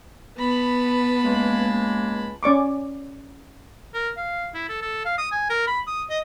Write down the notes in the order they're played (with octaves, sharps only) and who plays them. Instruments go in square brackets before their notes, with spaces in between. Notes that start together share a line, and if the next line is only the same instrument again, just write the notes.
[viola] B3 [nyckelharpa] A5 B5
[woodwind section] C#2 G#3 A#3
[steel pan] C#4 D5 C#6 D6
[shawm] A#4
F5
E4
A4
A4
F5
D#6
G#5
A#4
B5
D#6
D#5